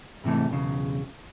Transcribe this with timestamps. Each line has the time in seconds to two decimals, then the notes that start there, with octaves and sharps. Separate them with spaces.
0.24 G#2 C3 E3 A3
0.48 B1 E2 C#3